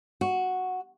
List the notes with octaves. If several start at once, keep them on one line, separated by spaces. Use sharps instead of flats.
F#4